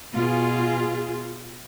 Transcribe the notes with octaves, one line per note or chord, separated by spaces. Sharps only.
B2 F4 G#4